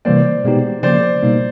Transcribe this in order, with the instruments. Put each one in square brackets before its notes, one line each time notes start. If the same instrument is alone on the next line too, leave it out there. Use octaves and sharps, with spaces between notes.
[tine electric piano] C3 E3 G3 A#3 [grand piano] C5 D5
[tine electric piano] B2 G#3 B3 D#4 G4
[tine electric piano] C#3 F3 A#3 [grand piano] C5 D5
[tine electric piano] B2 G3 A#3 D#4